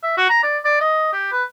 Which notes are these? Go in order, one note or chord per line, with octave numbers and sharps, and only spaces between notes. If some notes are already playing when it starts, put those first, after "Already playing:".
E5
F#4
A#5
D5
D5
D#5
G4
B4